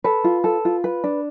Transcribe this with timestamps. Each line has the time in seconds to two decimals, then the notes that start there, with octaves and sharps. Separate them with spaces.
0.04 A4 B4
0.24 F4
0.44 A4
0.65 F4
0.84 B4
1.04 D4